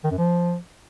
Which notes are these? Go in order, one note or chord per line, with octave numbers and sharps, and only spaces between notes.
D#3
F#2
F3